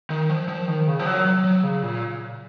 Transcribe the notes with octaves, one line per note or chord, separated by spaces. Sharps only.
D#3
F3
F3
D#3
C#3
F3
F#3
F#3
F#3
C#3
A#2